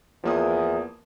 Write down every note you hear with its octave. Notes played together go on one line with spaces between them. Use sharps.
E2 F3 A#3 D#6